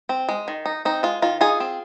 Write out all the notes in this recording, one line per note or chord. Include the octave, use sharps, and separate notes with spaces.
C4
G#3
D#3
D#4
C4 D#4
G#3 F4
D#3 F4
D#4 F4 G#4
C4